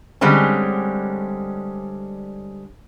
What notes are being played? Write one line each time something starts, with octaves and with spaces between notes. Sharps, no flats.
D3 G3 G#3 C4 C#4